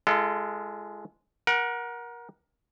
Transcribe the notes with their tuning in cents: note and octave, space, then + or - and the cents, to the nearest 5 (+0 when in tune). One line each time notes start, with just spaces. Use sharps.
G#3 +0 F4 -40 A4 +0
A#4 +25 F#5 -5